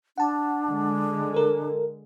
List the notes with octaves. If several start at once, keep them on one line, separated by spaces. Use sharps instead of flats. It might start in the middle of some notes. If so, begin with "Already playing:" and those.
D4 F#5 A5
D3 G#3
A4 A#4